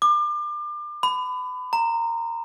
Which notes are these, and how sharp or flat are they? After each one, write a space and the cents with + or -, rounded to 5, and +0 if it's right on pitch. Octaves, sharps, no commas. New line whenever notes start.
D6 +30
B5 +30
A#5 -15